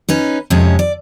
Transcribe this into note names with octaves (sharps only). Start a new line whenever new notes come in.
C#4 D#4 B4
F2 C3 G#3 C#4
D5